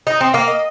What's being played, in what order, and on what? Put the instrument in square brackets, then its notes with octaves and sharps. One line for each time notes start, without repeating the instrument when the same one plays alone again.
[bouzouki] D#4 [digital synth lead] D#5
[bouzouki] C4
[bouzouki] A#3 [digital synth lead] F5
[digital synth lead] D#5